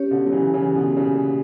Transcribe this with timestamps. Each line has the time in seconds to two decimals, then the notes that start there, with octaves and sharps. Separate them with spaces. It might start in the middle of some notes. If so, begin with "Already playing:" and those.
Already playing: C#4 G4 C#5
0.11 B2 D3
0.26 F#3
0.32 C#3 E3
0.53 C#3 E3
0.75 B2 D3
0.97 A#2 C#3